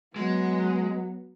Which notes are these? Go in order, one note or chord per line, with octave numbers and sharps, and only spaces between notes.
F#3 G#3 B3